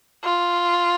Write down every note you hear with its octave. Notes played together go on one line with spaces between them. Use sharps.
F4